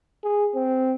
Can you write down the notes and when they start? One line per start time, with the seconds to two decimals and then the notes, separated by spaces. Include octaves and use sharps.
0.23 G#4
0.55 C4